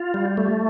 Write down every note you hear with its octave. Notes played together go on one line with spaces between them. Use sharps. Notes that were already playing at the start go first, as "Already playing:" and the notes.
Already playing: F4
G3
A3